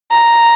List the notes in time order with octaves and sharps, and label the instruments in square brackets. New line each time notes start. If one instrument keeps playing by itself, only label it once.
[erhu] A#5